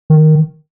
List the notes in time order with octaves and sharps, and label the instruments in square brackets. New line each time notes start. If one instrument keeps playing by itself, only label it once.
[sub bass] D#3